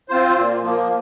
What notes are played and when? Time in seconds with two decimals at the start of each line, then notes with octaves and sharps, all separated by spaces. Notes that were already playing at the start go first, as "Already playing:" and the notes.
0.09 C4 F4 C5
0.36 A#2
0.62 F3 A#3